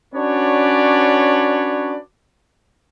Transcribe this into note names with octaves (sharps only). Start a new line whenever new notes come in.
C#4 D4 F#4 B4 C#5 D5